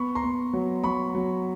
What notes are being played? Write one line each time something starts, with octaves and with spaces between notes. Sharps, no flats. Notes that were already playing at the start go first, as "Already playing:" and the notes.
Already playing: B3 B5 C#6
A#5 C6
B3
F#3
F#3 B5 C#6
F#3